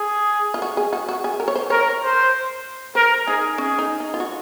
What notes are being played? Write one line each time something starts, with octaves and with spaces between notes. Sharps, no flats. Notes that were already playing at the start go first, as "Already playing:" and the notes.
Already playing: G#4
F4
F#4
G#4
F#4
F#4
G#4
A#4
C#5
C5
A#4 C#5
C5
A#4 C5
D#4 G#4
C#4 G#4
D#4
D#4
F4
F#4